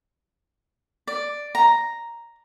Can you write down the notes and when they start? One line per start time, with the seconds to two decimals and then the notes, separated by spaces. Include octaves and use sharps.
1.07 D5
1.55 A#5